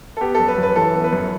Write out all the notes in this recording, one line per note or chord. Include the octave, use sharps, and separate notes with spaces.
A4
B3 G4
F#2 A4
B4
F#2 B4
E3 A4
B3
B4
F#2